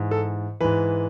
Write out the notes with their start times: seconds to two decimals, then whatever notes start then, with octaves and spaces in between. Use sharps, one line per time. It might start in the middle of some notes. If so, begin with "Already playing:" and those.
Already playing: G#2 E3
0.11 A4
0.61 G#2 E3 B4